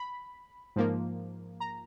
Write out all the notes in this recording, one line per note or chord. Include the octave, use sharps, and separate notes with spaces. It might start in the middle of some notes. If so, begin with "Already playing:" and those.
Already playing: B5
G#2 F3 A#3
A#5